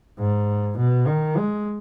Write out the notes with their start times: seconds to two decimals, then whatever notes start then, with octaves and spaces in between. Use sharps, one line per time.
0.19 G#2
0.78 B2
1.07 D#3
1.37 G#3